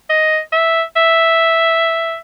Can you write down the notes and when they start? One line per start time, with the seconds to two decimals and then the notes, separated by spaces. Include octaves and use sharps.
0.09 D#5
0.52 E5
0.96 E5